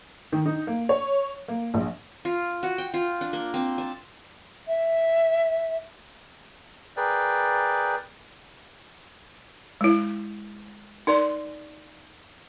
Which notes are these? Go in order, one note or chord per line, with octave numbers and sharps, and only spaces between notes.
D#3
D#4
A#3
C#5
A#3
A#1
F4
F#4
G5
F4
D4
A#3
C4
A5
E5
G#4 A#4 B4 D5 G5
G#3 E4
D#4 A#4 D5 C6